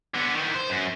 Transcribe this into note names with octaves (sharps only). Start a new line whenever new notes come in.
D3 B3
D#3 E3
C5
F#2